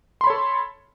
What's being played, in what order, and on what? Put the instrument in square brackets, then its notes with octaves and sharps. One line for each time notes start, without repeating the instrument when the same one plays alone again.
[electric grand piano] C6
B5
C#5
A4